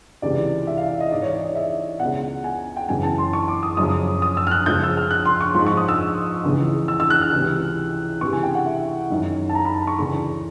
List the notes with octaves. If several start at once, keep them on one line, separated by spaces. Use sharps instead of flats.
C#2 C3 E3 D5
E5
F5
E5
D#5
G#2 E3 D5
C#5
D5
D#5
E5
C#2 B2 F#5
G#5
G5
F#2 C#3 E3 G#5
A5
C6
C#6
D6
D#6
F#2 C#3 F3 D#6
D#6
E6
F6
F#6
C#2 C#3 F3 G6
E6
F6
F#6
C6
C#6
G#2 F3 C6
C#6
D#6
E6
C#2 C#3 E3
E6
E6
F#6
F6
C#2 C3 E3
C#2 C3 E3 C#6
G#5
G5
F#5
E5
F#2 D#3
A5
A#5
B5
C#6
D2 C#3 E3 C#6